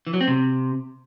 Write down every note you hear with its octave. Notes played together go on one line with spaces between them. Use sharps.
E3
F#3
C4
C3